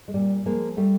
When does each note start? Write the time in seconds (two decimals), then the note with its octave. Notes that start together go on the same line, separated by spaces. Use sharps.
0.08 G#3
0.14 A#2 G3
0.45 F3 G#3 A#3
0.77 G3 A3